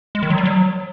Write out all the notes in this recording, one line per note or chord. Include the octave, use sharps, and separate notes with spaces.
G#3
D#3
F#3
G3
F#3